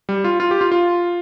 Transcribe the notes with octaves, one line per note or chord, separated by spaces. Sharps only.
G3
F4
F4
G4
F4
F4